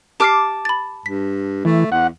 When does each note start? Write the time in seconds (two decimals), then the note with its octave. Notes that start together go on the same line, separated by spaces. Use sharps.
0.20 G4 A5 D6 F6 C7
0.65 B5 A6
1.06 G2 B6
1.65 E3 A3
1.92 E2 F#5